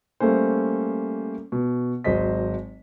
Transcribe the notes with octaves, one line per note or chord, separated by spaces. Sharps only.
G3 A3 A#3 C#4 C5
B2
G#1 F#3 C5 D#5 B6